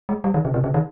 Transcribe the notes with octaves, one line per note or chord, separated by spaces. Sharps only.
G#3
G3
D#3
C#3
C3
C#3
D#3